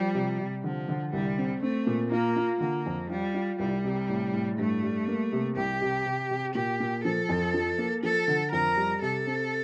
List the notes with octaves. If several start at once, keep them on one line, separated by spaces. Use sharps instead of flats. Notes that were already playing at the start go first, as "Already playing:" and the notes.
Already playing: F3 G3
C3
C3
D3 F3
D3
C2 G3
C4
A3 C4
A#2
A#3 F4
F4
D3 A#3
F2
G3 F4
F4
C2 G3
C3
A2
A2
G2 A3
G3
A#3
C3
C2 G4
C3
C3
C3
A#2 G4
A#2
F3 A4
F2
F3
A#3
F3 A4
D3
F2 A#4
G3
C3 A4
C4